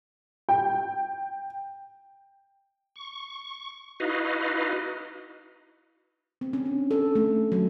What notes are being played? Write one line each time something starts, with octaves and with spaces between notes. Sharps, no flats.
G5
C#6
D#4 E4 F#4 B4 D#5 F5
C4
C#4
D4
A4
A3
F#3